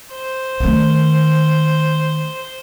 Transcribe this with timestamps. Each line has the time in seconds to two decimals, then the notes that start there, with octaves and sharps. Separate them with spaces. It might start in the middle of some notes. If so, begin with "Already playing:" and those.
0.12 C5
0.60 D#3 A3